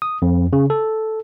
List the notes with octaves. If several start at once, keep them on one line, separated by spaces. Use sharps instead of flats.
D#6
F2
C#3
A4